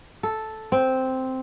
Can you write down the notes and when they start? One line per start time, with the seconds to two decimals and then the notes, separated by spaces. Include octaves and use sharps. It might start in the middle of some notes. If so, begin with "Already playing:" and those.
0.23 A4
0.72 C4